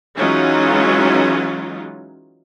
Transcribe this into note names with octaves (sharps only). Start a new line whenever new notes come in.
E3 F#3 G#3 C#4 D#4 F4